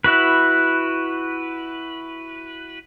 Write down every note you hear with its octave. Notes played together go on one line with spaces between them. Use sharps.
E4 F#4 B4